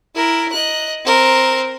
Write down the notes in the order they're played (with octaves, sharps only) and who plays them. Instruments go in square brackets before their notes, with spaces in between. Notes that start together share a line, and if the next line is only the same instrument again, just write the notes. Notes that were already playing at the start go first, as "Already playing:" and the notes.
[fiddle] E4 A#4
D#5 F#6
C4 A#4